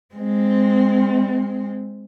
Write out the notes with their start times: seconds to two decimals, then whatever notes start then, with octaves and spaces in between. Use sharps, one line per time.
0.15 G#3 C4